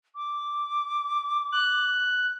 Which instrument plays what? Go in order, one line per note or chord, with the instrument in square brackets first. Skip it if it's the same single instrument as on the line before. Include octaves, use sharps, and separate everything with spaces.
[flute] D6
[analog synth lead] F#6